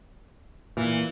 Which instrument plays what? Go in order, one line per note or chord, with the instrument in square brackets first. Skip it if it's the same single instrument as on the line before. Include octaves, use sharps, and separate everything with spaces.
[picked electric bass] A#2 [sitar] E3